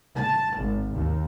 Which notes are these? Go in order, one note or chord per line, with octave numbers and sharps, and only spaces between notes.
A5
G#1
D#2